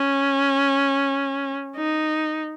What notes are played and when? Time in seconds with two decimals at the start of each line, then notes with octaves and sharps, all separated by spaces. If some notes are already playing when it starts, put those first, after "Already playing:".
Already playing: C#4
1.77 D#4